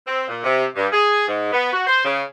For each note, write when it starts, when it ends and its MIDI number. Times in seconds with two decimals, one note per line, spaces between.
0.07 0.25 60
0.28 0.41 46
0.43 0.65 48
0.76 0.87 43
0.92 1.25 68
1.28 1.52 44
1.52 1.69 59
1.73 1.84 66
1.87 2.02 72
2.05 2.22 49